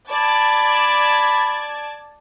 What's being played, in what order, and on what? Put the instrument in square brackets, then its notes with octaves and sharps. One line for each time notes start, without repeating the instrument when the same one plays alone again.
[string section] D5 A5 G#6 [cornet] B5